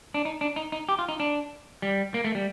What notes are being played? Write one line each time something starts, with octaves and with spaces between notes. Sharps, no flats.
D4
D#4
D4
D#4
D#4
G4
F4
D#4
D4
G3
A#3
A3
G3